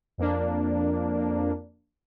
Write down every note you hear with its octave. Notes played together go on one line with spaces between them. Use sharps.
F2 A#3 D4